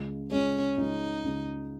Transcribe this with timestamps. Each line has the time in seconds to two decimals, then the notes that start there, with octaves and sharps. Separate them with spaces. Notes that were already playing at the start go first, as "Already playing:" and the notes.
Already playing: C#2 C#3 G#3
0.31 C#2 C#3 G#3 C#4
0.77 C#2 C#3 G#3 D#4
1.24 C#2 C#3 G#3